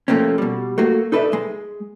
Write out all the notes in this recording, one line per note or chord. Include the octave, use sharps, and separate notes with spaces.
C3 F3 A3 A#3 C4 C#4
B2 G3
A3 A#3 F#4
D#4 A4 B4 D5 E5
G#3